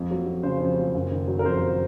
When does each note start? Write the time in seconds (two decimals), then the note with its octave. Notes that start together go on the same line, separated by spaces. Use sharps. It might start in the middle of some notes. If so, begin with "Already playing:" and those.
Already playing: F2
0.11 F#3
0.26 F2
0.43 C#3 C5
0.61 F2
0.78 F#3
0.94 F#1
1.11 D#3
1.28 F#3
1.39 A#4
1.45 F2 C5